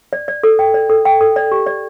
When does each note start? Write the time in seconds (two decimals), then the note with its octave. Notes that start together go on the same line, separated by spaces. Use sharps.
0.13 D5
0.28 D5
0.43 A4
0.59 G5
0.74 D5
0.89 A4
1.05 G5
1.21 A4
1.36 D5
1.52 G4
1.67 D5